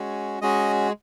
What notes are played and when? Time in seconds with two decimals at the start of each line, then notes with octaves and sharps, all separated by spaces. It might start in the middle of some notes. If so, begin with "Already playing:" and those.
Already playing: G#3 C#4 F#4
0.41 G#3 C#4 F#4 D#5